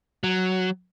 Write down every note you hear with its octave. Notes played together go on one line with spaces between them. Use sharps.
F#3